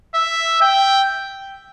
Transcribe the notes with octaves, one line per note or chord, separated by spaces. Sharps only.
E5
G5